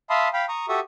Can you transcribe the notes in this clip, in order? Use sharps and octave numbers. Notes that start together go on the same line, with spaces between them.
E5 F5 A5 B5 C6 D#6
F5 G5 B5
A#5 C#6 D#6
F#4 G4 A4 E5 C#6 D#6